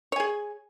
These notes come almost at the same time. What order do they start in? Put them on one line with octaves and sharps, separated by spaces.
C#5 G#5 G#4